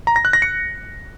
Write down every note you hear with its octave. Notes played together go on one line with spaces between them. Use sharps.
A#5
A#6
F#6
A#6
C#7